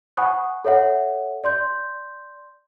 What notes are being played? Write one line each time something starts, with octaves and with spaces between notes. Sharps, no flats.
F#5 G#5 B5 C#6 D#6 F#6
A4 C#5 E5 F#5
D5 C6 G6